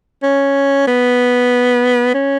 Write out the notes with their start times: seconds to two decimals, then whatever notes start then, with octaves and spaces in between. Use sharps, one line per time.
0.23 C#4
0.87 B3
2.14 C#4